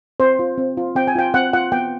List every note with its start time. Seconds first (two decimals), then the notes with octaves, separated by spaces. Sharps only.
0.20 C4 C5
0.39 F4
0.58 C4
0.77 F4
0.96 C4 G5
1.07 G#5
1.16 F4 G5
1.34 C4 F#5
1.53 F4 F#5
1.72 B3 G5